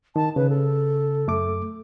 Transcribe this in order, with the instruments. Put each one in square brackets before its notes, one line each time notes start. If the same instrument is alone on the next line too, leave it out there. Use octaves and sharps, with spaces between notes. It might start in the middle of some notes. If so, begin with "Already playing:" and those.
[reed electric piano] D#3 [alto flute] A5
[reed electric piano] C#3 [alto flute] B4
[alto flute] A4
[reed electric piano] F#2 A3 D6